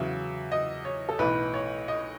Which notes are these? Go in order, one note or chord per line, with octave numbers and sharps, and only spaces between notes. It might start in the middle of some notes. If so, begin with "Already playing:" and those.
Already playing: E2 C#3 F#3 E5
D#5
C#5
A4
B1 A2 E3 B4
C#5
D#5